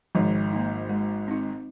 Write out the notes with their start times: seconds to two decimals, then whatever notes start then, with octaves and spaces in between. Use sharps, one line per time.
0.15 G#1 G#2 F3
0.53 A#3 D#4
0.89 G#3
1.28 C4 D#4